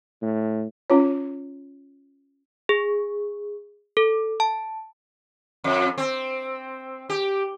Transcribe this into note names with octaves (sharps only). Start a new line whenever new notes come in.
A2
C#4 F4 C#5
G#4
A4
A5
F2
C4
G4